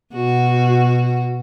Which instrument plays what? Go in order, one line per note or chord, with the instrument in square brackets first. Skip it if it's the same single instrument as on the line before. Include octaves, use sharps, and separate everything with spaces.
[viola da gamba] B2 F#4